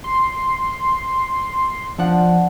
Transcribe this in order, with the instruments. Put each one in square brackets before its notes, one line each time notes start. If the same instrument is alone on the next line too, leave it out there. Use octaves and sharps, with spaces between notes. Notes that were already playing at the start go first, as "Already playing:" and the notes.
[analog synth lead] C6
[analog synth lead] F3 [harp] D4 F#5